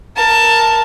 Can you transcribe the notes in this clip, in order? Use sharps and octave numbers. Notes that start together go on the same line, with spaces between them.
A#4 A5